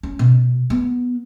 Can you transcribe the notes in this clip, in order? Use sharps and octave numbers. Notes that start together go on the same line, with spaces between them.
C#4
B2
B3